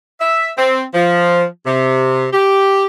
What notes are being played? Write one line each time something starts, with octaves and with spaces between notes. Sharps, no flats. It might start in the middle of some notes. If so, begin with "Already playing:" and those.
E5
C4
F3
C3
G4